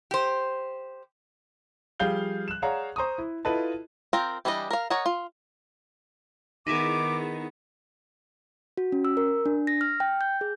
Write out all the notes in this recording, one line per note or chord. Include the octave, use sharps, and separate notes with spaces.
G4 C5
F3 G3 G#4 F5 G6 G7
F#6 E7
G#4 C#5 D5 F5 F#5 A#5
C5 A#5 C#6 D#6
E4
E4 F4 A4 B4 D#5 A5
C4 F4 A#4 G5
E3 G3 D4 F#4 D#5
A#4 F5
A#4 C#5 D#5 F#5
F4
D#3 B3 D#4 E4 G#4 D6
F#4
C#4
E6
A#4
D4
A#6
F6
G5
G6
G#4